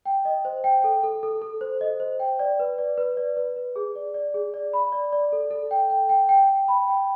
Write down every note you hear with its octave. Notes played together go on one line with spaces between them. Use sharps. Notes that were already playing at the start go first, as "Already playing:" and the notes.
G5
D#5
C5
G5
A4
A4
A4
A4
C5
D#5
C5
G5
D5
B4
D5
B4
D5
B4
B4
G#4
D5
D5
G#4
D5
B5
D5
D5
A4
A4
G5
G5
G5
G5
G5
B5
G5